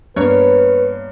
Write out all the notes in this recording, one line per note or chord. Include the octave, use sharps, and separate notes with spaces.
G2 A#3 B3 B4 C#5